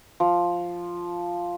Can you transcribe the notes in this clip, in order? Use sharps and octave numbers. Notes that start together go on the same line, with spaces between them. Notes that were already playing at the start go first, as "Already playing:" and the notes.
F3